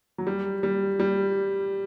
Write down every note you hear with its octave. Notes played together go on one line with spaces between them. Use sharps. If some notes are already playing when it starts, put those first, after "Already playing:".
F#3
G3
G3
G3